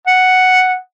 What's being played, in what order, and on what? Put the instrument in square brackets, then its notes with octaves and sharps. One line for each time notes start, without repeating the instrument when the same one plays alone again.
[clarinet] F#5